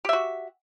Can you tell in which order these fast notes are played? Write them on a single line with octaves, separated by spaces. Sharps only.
G4 E5 F#4